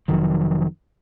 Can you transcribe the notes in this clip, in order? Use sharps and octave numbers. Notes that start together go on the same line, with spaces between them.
F1 F2 D#3 F#3